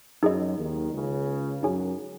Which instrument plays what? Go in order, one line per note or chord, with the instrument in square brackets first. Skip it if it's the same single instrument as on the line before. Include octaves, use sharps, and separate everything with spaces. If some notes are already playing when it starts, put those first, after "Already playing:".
[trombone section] F#2 F#3 [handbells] D#4 G#4 D#5
[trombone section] D#2 D#3
C#2 C#3
[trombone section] F#2 F#3 [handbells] D#4 G#4 C#5 G#5